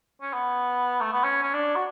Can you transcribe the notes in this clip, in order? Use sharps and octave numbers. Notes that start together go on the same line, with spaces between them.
C#4
B3
A3
B3
C#4
C#4
D4
F#4